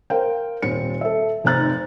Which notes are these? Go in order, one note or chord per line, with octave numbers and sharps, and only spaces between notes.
A#4 C5 F5 G5
D#1 C4 C#7
A4 E5
F1 C4 D#4 A#5 F#6 A6